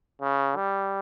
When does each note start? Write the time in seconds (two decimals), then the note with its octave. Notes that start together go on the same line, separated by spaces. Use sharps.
0.21 C#3
0.56 G3